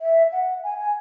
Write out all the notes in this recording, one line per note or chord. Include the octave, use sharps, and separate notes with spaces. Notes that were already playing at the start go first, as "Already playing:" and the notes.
E5
F#5
G#5
G#5